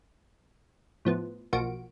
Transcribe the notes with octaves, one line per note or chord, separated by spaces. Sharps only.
A2 F3 B3
B1 F3 A#3 F#4 D7